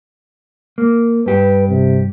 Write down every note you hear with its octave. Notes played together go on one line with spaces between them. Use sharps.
A#3
G2 G4 B4
C3